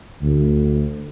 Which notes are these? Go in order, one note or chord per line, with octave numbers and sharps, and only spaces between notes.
D2